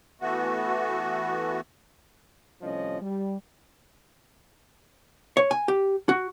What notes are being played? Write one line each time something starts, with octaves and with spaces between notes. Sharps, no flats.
E3 A3 B3 F#4
C2 A2 F3 C#4 D#5
G3
C#5
G#5
G4
F#4